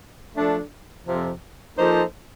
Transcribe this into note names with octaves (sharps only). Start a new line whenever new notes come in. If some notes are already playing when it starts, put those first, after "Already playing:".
F3 A3 D4 A4
F2 C3 F3
F3 A#3 D#4 A4 C5